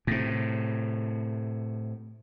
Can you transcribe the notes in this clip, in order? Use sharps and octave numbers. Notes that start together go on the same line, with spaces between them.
A2 C3